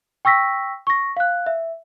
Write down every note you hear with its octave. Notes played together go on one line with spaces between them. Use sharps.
G5 C#6 E6 A#6 B6
C#6 A#6
F5 F#6
E5